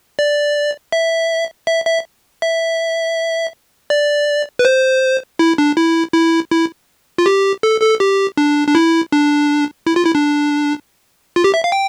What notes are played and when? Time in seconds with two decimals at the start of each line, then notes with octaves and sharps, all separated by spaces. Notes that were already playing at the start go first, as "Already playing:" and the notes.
0.19 D5
0.92 E5
1.67 E5
1.86 E5
2.42 E5
3.90 D5
4.59 B4
4.65 C5
5.39 E4
5.58 D4
5.77 E4
6.14 E4
6.52 E4
7.18 F4
7.26 G4
7.63 A4
7.81 A4
8.00 G4
8.37 D4
8.68 D4
8.75 E4
9.12 D4
9.87 E4
9.96 F4
10.05 E4
10.15 D4
11.36 F4
11.44 G4
11.54 E5
11.64 F5
11.72 G5